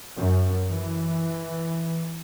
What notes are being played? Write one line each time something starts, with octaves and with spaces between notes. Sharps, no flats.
F#2
E3